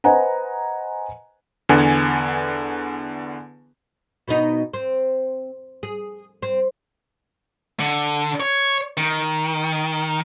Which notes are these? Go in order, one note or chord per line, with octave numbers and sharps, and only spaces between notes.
B4 C5 D#5 F#5 G#5 A#5
E2 D3 B3 G#5
B2 B3 D#4
C4
G#4
C4
D3
C#5
D#3